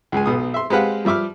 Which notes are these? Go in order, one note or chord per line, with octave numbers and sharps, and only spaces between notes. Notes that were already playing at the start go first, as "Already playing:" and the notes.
C#2 G#3 G#5
B1 B2 D#6
E5 C6
G#3 C4 G4 B4 F5 F#5
F3 G3 E5 D6 F6